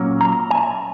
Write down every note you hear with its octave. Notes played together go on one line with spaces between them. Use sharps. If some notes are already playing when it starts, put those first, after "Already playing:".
Already playing: A#2 F#3 A#3 C#4
A#5
G#5